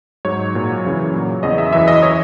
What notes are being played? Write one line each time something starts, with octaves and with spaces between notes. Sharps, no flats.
G#2 F#3 C#5
A#2 F#3
F#2 C#3 E3
A#2 F#3
E2 C#3 F#3 D#5
E5
F#2 E3 E5
D#5
E3 C#5